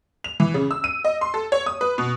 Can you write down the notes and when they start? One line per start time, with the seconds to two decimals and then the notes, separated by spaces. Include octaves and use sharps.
0.24 F7
0.40 E3
0.54 C#3
0.71 E6
0.84 D#7
1.05 D#5
1.21 C6
1.34 A4
1.52 C#5
1.66 D#6
1.81 B4
1.98 B2